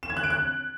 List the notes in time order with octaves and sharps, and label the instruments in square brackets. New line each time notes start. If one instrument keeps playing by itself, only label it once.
[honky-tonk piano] E7
G#6
F#6
D7
F#6